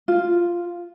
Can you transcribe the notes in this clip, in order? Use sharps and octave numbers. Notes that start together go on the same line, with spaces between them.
F4